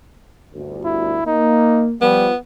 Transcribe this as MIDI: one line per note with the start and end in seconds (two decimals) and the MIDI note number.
0.54 1.19 31
0.54 1.19 38
0.84 1.23 64
1.26 1.94 58
1.26 1.86 63
2.01 2.30 53
2.01 2.29 55
2.01 2.36 59